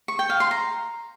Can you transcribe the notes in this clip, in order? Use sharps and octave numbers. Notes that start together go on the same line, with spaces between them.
C#6
G5
F5
C6
A#5